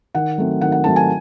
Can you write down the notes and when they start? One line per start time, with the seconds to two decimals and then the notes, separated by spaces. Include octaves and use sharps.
0.15 D#3 F#5
0.38 F#3 A3 C4
0.61 D#3 F#5
0.72 F#5
0.84 F#3 A3 C4 A5
0.96 G#5